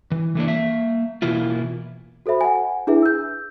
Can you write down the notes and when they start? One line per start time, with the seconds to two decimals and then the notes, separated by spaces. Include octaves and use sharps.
0.11 E3
0.35 E3 A3 A#3 D4
0.47 A#3 E5
1.22 B2 E3 A#3 E4 F4
2.26 F#4 A4 C5 E5 B5
2.41 F#5 G#5
2.87 D4 E4 G#4 B4 E5
3.02 E6 G6